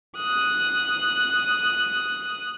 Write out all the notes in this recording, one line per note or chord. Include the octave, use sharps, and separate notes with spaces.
D#6 F#6